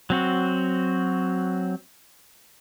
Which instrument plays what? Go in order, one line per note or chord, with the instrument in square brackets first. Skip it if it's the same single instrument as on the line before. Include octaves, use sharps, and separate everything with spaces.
[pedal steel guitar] F#3 C4 F#4